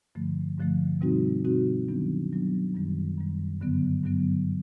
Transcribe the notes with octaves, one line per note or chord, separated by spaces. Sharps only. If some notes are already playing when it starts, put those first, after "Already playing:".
G2 D3 F3 A3
G2 D3 F3 A3
B2 G3 C4 D#4 F#4
B2 G3 C4 D#4 F#4
D#3 F#3 B3 D4
D#3 F#3 B3 D4
F#2 D#3 G3
F#2 D#3 G3
G2 D3 F#3 B3
G2 D3 F#3 B3